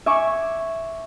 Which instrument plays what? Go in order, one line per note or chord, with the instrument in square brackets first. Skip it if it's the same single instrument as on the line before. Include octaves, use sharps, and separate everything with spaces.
[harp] E5 G#5 C#6 D6